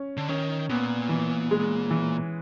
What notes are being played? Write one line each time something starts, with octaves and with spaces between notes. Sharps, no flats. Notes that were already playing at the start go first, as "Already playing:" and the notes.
Already playing: C#4
D3
D#3 C#4
A#2 B3
E3
G#3
E3